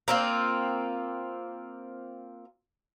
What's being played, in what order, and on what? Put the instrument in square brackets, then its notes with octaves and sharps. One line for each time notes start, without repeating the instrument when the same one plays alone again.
[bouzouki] A#3 C4 F4